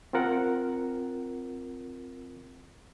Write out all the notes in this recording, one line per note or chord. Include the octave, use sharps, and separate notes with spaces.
C4 F4 A#4 F#5